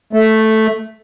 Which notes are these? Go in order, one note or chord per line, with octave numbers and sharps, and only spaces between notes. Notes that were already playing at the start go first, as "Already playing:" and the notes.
A3